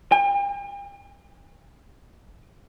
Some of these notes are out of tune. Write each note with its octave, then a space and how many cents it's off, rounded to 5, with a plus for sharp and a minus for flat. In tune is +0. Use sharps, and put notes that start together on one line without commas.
G5 +40